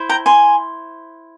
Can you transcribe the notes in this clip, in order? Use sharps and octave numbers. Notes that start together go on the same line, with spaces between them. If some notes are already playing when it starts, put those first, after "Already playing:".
Already playing: E4 C5
G5 A#5
G#5 C6